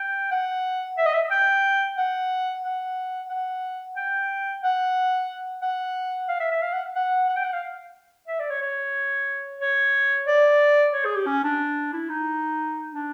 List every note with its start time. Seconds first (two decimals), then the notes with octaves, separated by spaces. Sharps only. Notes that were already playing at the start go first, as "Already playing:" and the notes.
Already playing: G5
0.31 F#5
0.98 E5
1.06 D#5
1.13 E5
1.31 G5
1.97 F#5
2.64 F#5
3.29 F#5
3.96 G5
4.63 F#5
5.62 F#5
6.28 F5
6.40 E5
6.51 E5
6.62 F5
6.73 F#5
6.95 F#5
7.29 F#5
7.37 G5
7.44 F#5
7.53 F5
8.28 E5
8.39 D5
8.50 C#5
8.61 C#5
9.61 C#5
10.27 D5
10.93 C#5
11.05 G#4
11.15 G4
11.26 C#4
11.44 D4
11.93 E4
12.09 D#4
12.93 D4